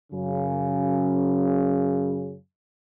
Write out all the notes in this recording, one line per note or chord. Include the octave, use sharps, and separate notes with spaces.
F#2 C#3